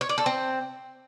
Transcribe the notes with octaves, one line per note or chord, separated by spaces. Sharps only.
C#5
D5
A4
C4